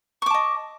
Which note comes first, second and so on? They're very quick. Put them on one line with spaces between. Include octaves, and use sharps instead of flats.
C#6 D6 A5 D#5